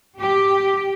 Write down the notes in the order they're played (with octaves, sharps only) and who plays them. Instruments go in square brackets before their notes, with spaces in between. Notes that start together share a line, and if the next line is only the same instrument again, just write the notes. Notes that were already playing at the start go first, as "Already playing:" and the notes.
[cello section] G4